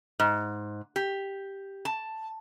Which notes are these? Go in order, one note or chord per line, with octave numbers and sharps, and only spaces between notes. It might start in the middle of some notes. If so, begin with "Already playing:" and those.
G#2
G4
A5